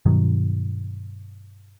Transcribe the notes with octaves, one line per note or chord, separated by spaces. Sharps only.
G2 B2 D#3 F#3